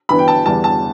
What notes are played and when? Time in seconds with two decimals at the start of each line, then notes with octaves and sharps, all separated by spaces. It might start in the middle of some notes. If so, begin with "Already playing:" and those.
0.09 G2 E3 B3 B5
0.19 G5
0.28 A5
0.46 E2 E3 G3 A5
0.64 A5